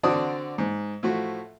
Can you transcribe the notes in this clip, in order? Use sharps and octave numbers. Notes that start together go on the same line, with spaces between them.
D3 C4 F#4 D5 A5 D#6
G#2
A2 F3 A3 F#4